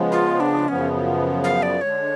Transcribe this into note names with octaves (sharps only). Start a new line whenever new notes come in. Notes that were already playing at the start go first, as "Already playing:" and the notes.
Already playing: C#3 F3 G#3 B3
F4
D4
F#2 C#3 F3 B3 C#4
F5
D5
D3 G#3 D4 C#5